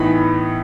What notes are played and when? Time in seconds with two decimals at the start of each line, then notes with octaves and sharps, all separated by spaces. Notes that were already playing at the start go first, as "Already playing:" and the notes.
Already playing: A2 E3 B3 D#4 B5